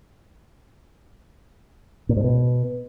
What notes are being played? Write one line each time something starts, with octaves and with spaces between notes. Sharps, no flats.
A#2
G#2
B2